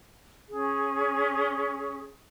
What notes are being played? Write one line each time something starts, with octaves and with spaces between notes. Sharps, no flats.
C#4 G#4